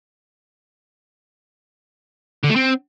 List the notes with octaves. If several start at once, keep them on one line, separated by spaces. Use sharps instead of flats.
D3
A3
C4